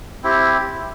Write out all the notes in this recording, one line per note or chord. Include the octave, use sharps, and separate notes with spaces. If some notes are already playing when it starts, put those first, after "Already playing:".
C4 E4 G4